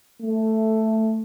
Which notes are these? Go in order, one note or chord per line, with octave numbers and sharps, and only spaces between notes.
A3